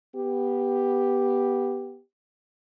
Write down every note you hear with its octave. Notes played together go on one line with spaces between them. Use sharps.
B3 G4